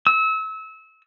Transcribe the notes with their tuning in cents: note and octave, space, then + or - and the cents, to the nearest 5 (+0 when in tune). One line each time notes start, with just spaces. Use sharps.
E6 -30